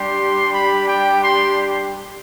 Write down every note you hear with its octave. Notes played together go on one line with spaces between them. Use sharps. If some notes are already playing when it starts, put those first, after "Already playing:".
Already playing: G3 D4 G4 C6
B5
G5
C6